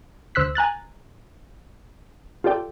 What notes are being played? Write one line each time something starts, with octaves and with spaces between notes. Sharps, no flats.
D2 C5 E6 F#6 B6
G#5 A#5 F#6 A6
F4 G4 A4 D5 G5